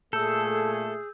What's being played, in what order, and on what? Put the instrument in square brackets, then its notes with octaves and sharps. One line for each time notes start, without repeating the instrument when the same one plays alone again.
[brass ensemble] A#2 A3 [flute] G#4 [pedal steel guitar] A4 [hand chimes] E6 G6